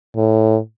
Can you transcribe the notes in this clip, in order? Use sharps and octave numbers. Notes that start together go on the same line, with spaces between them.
A2